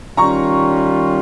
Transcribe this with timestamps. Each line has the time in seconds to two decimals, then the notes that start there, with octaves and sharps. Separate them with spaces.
0.17 D#3 G3 C#4 F4 A#5 C#6